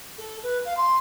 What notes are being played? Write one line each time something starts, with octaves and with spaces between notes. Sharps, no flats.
A4
B4
F5
C6